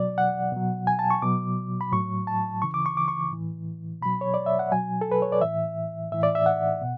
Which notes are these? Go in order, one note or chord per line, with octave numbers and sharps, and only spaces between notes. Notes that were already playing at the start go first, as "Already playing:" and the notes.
Already playing: B2 F#3 D5
F#5
B2 F#3
G#5
A5
C#6
B2 F#3 D6
B5
A2 F#3 C#6
A5
C#3 E3 C#6
D6
C#6
D6
C#6
A2 E3
B2 F#3 B5
C#5
D5
E5
F#5
B2 F#3 G#5
A4
B4
C#5
D5
A2 E3 E5
A2 E3 E5
D5
E5
F#5
B2